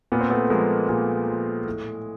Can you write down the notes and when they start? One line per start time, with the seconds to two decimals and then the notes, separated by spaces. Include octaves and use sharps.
0.12 A#2 B3
0.21 C4
0.30 A3 B3
0.50 F3 G#3 A#3
0.89 A#2 G#3
1.28 F3
1.66 A2